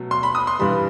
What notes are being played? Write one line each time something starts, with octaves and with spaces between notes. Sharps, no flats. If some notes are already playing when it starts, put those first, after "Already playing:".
Already playing: B2 F#3 A3
C6
B5
D#6
C6
G2 E3 G3 B5